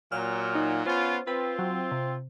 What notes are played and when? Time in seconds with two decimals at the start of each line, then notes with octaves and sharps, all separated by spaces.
0.12 A#2 F#3 F6
0.55 D#4
0.86 B3 C#4 F4 C5
1.27 C4 F4 B4
1.59 F#3
1.92 C3